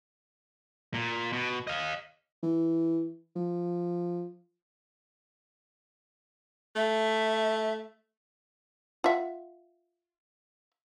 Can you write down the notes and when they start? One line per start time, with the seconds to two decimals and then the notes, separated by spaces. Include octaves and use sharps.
0.94 A#2
1.33 B2
1.67 D#5 F5
2.43 E3
3.36 F3
6.76 A3 E5
9.04 F4 E5 F#5